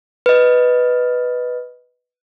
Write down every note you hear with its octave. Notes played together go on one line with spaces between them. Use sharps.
B4 D#5